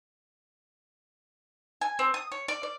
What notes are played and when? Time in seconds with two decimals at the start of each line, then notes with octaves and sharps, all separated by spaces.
1.81 G#5
1.99 C4
2.14 D#6
2.32 C#5
2.48 D5
2.63 D5